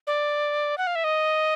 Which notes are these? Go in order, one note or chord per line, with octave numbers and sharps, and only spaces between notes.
D5
F#5
F5
E5
D#5